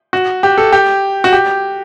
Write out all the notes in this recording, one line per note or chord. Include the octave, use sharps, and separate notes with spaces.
F#4
G4
A4
G4
F#4
G4